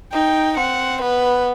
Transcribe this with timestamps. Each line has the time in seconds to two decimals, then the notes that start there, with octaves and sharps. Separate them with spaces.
0.13 D#4 G5
0.57 C4 F#5
1.02 B3 B4